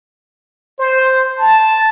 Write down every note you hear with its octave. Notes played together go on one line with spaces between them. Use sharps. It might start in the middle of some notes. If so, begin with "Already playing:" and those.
C5
A5